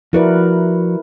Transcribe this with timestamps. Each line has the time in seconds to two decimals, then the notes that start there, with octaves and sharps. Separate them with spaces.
0.13 F3 E4 F#4 A#4 B4 D5